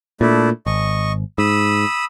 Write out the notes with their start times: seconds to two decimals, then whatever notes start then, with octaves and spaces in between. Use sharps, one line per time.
0.21 A#2 A3 D4 E4
0.66 G#1 D#5 C#6
1.38 G#2 B5 D#6 E6